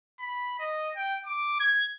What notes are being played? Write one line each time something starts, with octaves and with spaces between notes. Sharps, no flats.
B5
D#5
G5
D6
G#6